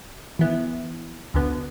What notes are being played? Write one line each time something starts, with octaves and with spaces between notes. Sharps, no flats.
E3 B3 E4
D2 D3 B3